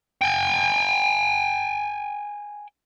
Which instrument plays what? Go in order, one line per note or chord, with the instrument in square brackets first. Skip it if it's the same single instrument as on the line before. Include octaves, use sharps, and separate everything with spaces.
[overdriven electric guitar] G5 G#5